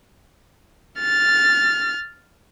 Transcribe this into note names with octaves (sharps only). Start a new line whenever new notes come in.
F6 A6